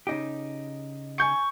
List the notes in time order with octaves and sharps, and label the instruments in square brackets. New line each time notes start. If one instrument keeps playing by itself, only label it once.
[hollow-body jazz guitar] C#3 D#4 G4
[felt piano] G#5 G6 C#7 [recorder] C#6